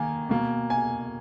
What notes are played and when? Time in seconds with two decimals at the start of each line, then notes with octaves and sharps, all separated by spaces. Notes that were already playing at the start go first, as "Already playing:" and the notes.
Already playing: D#3 A#3 G#5
0.29 B2 A#3
0.70 G#5